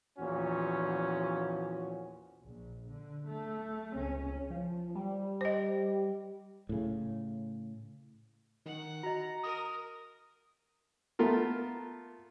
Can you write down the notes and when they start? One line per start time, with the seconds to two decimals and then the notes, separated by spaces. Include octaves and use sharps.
0.19 E2 A#2 F3 C#4 F#4
2.43 A#1
2.90 D3
3.27 A3
3.95 C#2 C#4
4.50 F3
4.95 G3
5.41 C5 D#5
6.69 A2 C#3
8.66 D#3 F#5
9.03 F#4 D#5 A#5
9.43 A#4 D#6
11.19 A3 B3 F4 A#4